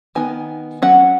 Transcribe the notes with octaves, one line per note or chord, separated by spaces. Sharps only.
D#3 B3 D#4 G#5
F#3 C#4 F#5